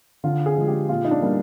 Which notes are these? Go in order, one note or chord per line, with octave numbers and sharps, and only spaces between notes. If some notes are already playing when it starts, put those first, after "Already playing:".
D3 F4
G#4
F3 G#3
G4
A#2 F4
D#4
D4
G3 A#3